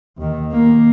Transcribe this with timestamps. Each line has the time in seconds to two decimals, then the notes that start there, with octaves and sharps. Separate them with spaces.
0.17 D#2 D#3
0.52 A#3